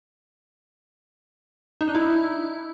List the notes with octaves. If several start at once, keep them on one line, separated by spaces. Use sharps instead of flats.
D#4
D4
E4